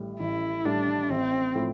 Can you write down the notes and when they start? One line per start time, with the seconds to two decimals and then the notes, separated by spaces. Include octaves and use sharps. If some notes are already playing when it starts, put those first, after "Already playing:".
Already playing: A1 A2 G3
0.20 A1 E4
0.65 A2 G3 D4
1.10 A1 C4
1.55 A2 F3